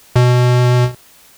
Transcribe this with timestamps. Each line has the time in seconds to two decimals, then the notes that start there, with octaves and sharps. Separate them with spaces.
0.16 B2